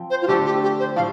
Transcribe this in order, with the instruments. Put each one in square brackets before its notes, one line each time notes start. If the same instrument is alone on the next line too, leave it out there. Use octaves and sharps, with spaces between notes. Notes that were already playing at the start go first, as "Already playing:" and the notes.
Already playing: [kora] F3 C4
[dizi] C5
F4
[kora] D3 A3 C4 A4 [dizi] G4
[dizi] G4
G4
C5
[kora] A2 F3 [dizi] F5